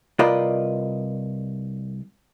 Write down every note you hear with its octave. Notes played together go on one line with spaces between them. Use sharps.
C2 F4 A#4 B4 D5 D#5